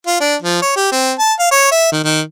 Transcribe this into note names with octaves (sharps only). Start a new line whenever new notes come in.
F4
D4
F3
C#5
G4
C4
A5
F5
C#5
E5
D#3
D#3